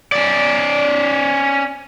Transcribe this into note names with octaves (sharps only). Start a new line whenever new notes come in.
C#4 D5